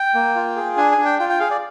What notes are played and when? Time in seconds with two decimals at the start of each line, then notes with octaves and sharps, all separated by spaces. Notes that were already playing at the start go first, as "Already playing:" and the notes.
Already playing: G5
0.14 A#3
0.35 F4
0.56 G#4
0.77 D4 G#5
0.92 G#5
0.98 D4
1.05 G5
1.19 F4 G5
1.30 G5
1.39 G#4 F5
1.50 D5